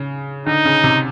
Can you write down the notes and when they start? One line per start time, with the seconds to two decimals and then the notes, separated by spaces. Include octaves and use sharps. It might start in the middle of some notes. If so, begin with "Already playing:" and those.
Already playing: C#3
0.46 D3 D#4
0.65 C#3
0.84 C3